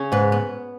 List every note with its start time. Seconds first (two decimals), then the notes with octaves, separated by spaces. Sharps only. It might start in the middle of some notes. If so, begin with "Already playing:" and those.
Already playing: C#3 C#4
0.12 G#2 B4
0.32 B3